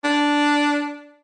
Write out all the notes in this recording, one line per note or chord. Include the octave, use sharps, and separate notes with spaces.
D4